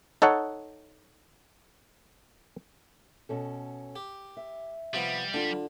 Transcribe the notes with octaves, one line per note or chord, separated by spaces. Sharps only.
D#4 A4 C#5 F#5
B2 C#4 A4
G4
E5
C3 F3 G3 B3
D3 D4 F4